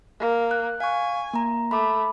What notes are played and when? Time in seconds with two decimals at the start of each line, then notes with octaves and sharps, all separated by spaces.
0.20 A#3
0.51 F#6
0.80 F5 G#5 C#6
1.33 A#3 A#5
1.71 A3 B5 D6